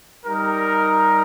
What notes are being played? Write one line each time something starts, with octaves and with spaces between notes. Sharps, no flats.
G3 D#4 A#4